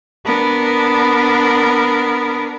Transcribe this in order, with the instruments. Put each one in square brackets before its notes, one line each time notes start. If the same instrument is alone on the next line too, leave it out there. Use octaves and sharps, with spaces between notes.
[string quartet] B3 D4 A#4